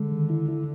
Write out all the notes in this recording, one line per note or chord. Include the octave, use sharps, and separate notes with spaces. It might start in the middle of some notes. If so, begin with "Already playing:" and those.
Already playing: D3 G#3
D#3
E4
E4